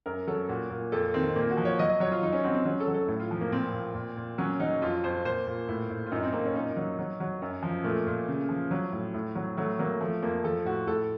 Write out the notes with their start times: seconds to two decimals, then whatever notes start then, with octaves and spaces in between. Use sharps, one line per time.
0.06 F#2 A#4
0.27 F#3 A4
0.49 A#2 F#4
0.70 A#2
0.92 F2 A4
1.14 D#3 C4
1.36 A#2 A#3
1.51 F#4
1.57 F3
1.65 C#5
1.79 F#3 D#5
1.89 D#5
2.00 F#3 C#5
2.12 F4
2.22 F#3 D#4
2.33 C#4
2.44 F#3 C4
2.55 C4
2.65 F#3 C#4
2.80 A4
2.87 F#3
2.94 A4
3.08 A2
3.20 F4
3.31 F3
3.41 A#3
3.52 A#2 C4
3.74 A#2
3.95 A#2
4.17 A#2
4.38 F#3 C#4
4.60 F#3 D#4
4.82 F2 F4
5.04 F2 C5
5.25 A#2 C5
5.47 A#2
5.68 A2
5.90 A2
6.07 F4
6.12 F#2 D#4
6.23 C4
6.33 F#2 A#3
6.45 C#4
6.54 A#2 D#4
6.76 F#3
6.99 F#3
7.20 F#3
7.42 F#2
7.63 F3
7.84 A#2 A3
8.07 A#2
8.28 C#3
8.49 F3
8.71 F#3
8.92 A2
9.14 A2
9.35 F#3
9.57 F#3 A3
9.79 F#3 A#3
10.01 F3 A3
10.22 F2 A#3
10.44 F3 A4
10.65 A2 F#4
10.87 A2 A4